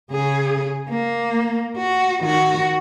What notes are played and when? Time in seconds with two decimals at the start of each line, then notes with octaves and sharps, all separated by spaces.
0.11 C#3 G#4
0.89 A#3
1.77 F#4
2.24 D#3 F#4